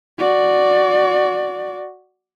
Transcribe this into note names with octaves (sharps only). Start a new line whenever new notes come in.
F#4 D5